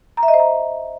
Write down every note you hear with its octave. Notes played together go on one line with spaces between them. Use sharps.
A#5
E5
D#5
C5
A#5